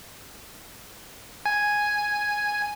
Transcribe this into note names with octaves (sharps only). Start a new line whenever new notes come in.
G#5